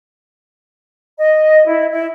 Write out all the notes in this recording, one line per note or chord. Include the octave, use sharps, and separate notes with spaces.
D#5
E4
E4